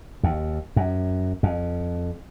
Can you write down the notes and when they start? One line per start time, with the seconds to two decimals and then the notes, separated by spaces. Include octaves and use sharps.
0.23 D#2
0.76 F#2
1.43 F2